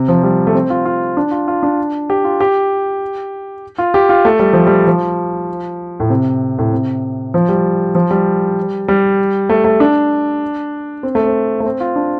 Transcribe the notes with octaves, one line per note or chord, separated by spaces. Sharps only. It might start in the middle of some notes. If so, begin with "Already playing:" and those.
Already playing: C3
F3
G3
A3
C4
F4
F4
D4
F4
F4
D4
G4
F4
G4
F4
G4
F4
A3
G3
F3
G3
F3
A2
C3
A2
C3
F3
G3
F3
G3
G3
A3
A3
D4
C4
A3
C4
A3
C4
F4
D4